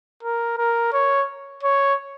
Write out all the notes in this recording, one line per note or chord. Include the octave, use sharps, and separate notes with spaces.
A#4
A#4
C#5
C#5